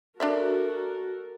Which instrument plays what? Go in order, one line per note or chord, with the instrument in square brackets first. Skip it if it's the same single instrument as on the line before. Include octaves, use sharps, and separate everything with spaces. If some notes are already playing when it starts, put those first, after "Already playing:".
[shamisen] D4 D5 E5 [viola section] F#4 A4 A#4